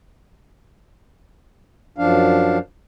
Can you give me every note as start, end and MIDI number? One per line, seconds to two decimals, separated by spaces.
1.98 2.58 42
1.98 2.58 53
1.98 2.58 62
1.98 2.58 77